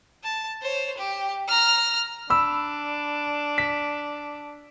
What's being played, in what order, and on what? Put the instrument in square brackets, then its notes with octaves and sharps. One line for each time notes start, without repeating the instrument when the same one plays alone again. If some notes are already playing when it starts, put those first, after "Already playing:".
[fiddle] A5
C5 C#5
G4
A#5 F6
[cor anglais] D4 [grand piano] B5 E6
[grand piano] B6